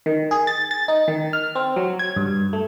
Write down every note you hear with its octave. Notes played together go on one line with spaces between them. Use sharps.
D#3
G#4
A6
A6
D#4
D#3
F6
C4
F#3
G#6
G2
A3